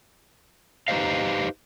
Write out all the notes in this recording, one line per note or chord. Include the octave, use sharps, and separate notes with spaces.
D#4 G4 B4 C5 D#5 F5